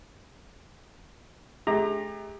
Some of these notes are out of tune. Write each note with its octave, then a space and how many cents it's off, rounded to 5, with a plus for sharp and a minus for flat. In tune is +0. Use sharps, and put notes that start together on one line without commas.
A3 -45 G4 +35 A#5 +0